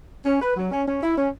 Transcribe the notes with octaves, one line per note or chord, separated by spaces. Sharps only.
C#4
B4
F#3
C#4
C#4
E4
C#4